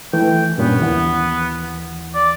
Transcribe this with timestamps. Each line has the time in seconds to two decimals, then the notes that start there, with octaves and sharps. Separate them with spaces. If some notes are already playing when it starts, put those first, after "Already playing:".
0.13 E3 A3 G5
0.58 G2 A#2 B3 C#4
0.80 D#2 E3 F#5
2.14 D5